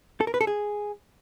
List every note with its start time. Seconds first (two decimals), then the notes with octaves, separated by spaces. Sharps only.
0.21 A4
0.27 A#4
0.34 B4
0.41 A4
0.47 G#4